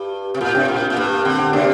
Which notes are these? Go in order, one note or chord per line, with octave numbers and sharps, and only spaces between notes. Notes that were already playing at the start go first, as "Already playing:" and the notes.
Already playing: G2
C3
A#2 F4 A#4
C3 D4 G4
A#2 F4 A#4
A#2
G2 A#3
D3 C4
C4
C3 A#3 D4